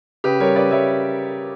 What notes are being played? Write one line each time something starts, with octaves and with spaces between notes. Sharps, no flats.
C#3 G4 B4
G3 A#4 C#5
C#3 B4 D5
G3 C#5 E5